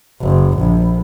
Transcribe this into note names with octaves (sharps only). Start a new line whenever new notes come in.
F#1
A#1